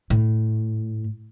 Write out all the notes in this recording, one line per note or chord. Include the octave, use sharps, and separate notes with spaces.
A2